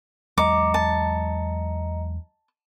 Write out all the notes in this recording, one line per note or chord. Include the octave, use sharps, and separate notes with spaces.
E2 F#3 G#3 D#5 A#5 D6 C#7
A5